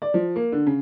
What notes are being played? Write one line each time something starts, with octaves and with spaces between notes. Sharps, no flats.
D5
F3
A#3
D3
C#3